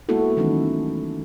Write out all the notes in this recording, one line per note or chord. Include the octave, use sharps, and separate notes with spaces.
G#3 A#3 B3 E4 F#4 A4
D#3 E3 F#3 A3 C#4 D#4